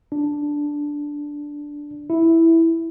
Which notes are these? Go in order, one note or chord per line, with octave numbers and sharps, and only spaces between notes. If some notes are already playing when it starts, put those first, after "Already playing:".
D4
E4